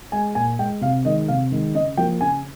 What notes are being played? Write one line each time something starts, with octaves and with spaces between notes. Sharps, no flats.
G#3 G#5
A#2 G#5
G#3 G5
C3 F5
D#3 G#3 D#5
C3 F5
D#3 G#3
C#3 D#5
F3 A#3 G5
C#3 G#5